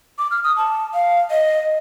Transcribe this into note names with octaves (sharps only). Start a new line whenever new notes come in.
D6
F6
D#6
A5
F5
D#5